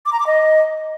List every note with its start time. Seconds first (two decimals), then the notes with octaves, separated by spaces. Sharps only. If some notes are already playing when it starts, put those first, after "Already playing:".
0.06 D6
0.13 A#5
0.20 D6
0.27 D#5